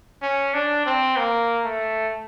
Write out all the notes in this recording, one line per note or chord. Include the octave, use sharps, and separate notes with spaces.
C#4
D4
C4
A#3
A3